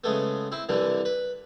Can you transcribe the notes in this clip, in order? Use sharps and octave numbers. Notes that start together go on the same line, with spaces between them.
C#3 G#3 A3 B3
C4 E4
C2 D3 E3 G3
B4